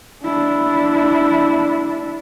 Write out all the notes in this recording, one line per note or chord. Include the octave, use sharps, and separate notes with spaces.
D4 E4